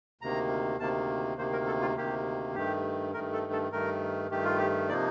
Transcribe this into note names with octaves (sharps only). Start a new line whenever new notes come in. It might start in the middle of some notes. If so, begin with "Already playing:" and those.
D2 C3 D#3 A#3 A#5
D2 C3 D#3 A#3 A5
D2 C3 D#3 A#3 C5
A#4
A4
F4
D2 C3 D#3 A#3 G4
G2 D#3 A3 G4
G2 D#3 A3 A#4
A4
A4
G2 D#3 A3 A#4
G2 D#3 A3 G4
F4
G4
C3 F3 A#3 D#4 D5